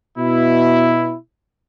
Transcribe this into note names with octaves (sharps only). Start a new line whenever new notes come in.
B2 E4